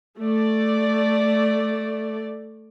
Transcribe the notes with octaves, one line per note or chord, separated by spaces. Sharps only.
A3 D5